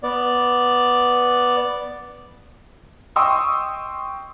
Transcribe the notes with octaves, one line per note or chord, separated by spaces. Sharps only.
B3 D5
D#5 G5 C6 C#6 D#6 E6